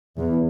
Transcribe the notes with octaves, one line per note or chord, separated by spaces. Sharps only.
E2